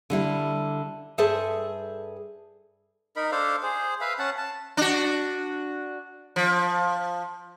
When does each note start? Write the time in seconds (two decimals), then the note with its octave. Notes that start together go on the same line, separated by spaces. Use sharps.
0.10 D3 G3 E4
1.18 G2 G#4 A4 C5 E5 A5
3.16 D#4 A#4 B5
3.32 D4 A4 C5 F5
3.63 G#4 C5
4.01 B4 E5 F5
4.19 C#4 F#5 A5
4.38 A5
4.77 D4 F#4
6.36 F3